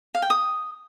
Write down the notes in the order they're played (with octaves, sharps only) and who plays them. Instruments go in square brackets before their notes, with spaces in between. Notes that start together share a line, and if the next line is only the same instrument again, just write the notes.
[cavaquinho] F5
G5
D#6